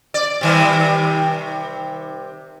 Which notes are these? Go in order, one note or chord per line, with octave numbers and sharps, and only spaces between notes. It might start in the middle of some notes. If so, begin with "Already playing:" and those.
D5
C3 D#3 G3